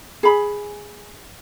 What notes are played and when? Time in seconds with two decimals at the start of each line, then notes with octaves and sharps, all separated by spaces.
0.23 G#4 B5